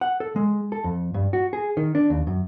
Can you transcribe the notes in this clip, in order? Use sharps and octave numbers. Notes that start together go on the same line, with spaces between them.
F#5
A4
G#3
A4
F2
G2
F#4
G#4
D#3
D4
D#2
F#2